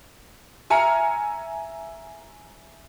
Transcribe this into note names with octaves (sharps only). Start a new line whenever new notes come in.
E5 G#5 A#5 F6 C#7